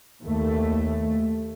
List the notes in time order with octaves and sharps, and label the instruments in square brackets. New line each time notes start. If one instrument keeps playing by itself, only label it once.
[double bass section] D#2 A3